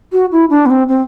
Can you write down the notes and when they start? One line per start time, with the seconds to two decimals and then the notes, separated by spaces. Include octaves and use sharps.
0.12 F#4
0.32 E4
0.50 D4
0.66 B3
0.70 C4
0.88 C4